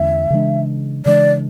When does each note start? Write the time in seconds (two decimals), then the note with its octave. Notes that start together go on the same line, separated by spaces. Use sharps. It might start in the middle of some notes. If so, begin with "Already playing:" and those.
Already playing: E2 D3 G#3 C#4 E5
0.30 C#3 E3 G#3 D4
1.06 C#3 E3 G#3 D4 D5